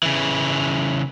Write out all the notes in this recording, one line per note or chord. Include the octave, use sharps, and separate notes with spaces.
C#3 E3